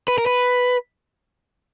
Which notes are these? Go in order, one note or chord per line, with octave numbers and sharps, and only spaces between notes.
B4
A#4
B4